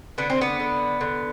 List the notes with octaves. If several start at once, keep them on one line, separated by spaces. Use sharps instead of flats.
D3 B3
C4
B3
D3
D3